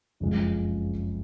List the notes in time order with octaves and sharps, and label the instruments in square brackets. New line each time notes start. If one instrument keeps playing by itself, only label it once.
[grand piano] F#1 F2 C#3 F3 G#3